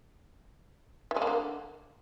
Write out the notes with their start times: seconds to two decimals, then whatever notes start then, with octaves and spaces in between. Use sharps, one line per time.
1.11 E3
1.16 G#3
1.22 A#3
1.27 D3